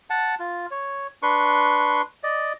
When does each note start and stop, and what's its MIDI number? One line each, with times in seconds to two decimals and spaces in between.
0.10 0.35 78
0.10 0.35 81
0.40 0.66 65
0.71 1.07 73
1.22 2.02 62
1.22 2.02 71
1.22 2.02 84
1.22 2.02 85
2.23 2.53 74
2.23 2.53 75